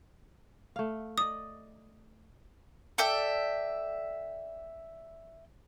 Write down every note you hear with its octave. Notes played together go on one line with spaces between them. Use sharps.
A3 F5
D5 D#5 D#6
A4 D5 E5 G5